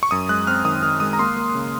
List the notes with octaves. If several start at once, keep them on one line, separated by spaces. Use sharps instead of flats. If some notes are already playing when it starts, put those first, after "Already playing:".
C#6
F#2 D#6
G#3 F#6
C4 F6
D#3 D#6
D#3 F6
G#3 D#6
A#5
A#3 C6
A#3
C#3